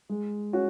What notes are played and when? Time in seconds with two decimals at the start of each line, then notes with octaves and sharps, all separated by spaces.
0.09 G#3
0.53 C#4 F#4